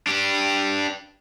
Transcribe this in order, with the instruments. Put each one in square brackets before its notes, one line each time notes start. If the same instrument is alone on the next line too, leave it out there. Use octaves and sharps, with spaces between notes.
[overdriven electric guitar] D4 G4